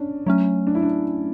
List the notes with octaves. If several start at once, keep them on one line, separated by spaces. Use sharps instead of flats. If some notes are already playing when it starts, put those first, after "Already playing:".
Already playing: C#4 D4
F#3 A3 C#4
D4
E4
D4